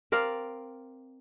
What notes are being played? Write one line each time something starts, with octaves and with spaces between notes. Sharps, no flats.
C4 A#4 D5 F5